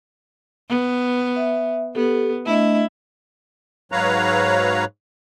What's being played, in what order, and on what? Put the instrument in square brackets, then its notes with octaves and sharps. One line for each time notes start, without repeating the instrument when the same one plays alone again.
[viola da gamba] B3
[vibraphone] E5
[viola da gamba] B3 [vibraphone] G4 A4
[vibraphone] A3 D4 D#5 [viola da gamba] E4
[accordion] G#2 F#3 B4 C#5 F5 A#5